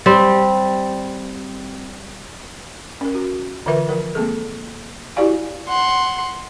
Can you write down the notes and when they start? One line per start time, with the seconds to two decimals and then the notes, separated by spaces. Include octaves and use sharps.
0.06 G3 C4
3.01 C#4 A#4
3.15 F#4
3.66 D3 E3 F4 A#4 B4 E5
3.89 F3 A#4
4.15 G#3 A#3 C4 G#4 A4
5.16 E4 F#4 G4 D5 F5 G#5
5.69 F#5 C6